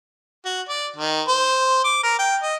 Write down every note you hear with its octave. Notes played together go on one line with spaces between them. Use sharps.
F#4
D5
D#3
C5
D6
A#4
G5
D#5